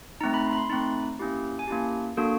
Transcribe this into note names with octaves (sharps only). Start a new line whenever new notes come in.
A3 C4 D#4 A#5
B5
C6
B5
C6
A3 C4 D#4 B5
A#3 C#4 E4 G4
G#5
A#3 C#4 E4 G4 A5
A#3 D4 F#4 A4